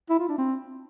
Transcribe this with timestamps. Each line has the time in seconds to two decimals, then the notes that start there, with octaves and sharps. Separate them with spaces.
0.10 E4
0.19 F4
0.29 D4
0.38 C4